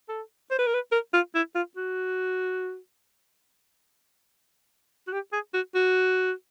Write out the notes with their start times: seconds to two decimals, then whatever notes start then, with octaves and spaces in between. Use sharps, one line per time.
0.09 A4
0.51 C5
0.59 B4
0.67 A#4
0.74 B4
0.92 A#4
1.14 F4
1.35 E4
1.55 F4
1.77 F#4
5.07 F#4
5.13 G4
5.33 G#4
5.54 F#4
5.75 F#4